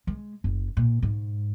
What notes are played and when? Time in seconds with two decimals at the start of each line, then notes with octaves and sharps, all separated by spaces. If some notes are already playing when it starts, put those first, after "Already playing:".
0.07 G#3
0.44 F#1
0.77 A#2
1.02 G#2